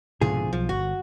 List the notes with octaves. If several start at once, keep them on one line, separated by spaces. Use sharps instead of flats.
C2 G#2 B2 D3 F3 G#4
B1 F3
G1 F#4